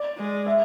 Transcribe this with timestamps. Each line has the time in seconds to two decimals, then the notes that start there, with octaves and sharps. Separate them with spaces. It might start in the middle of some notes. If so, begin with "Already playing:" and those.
Already playing: D5
0.18 G#3
0.46 E5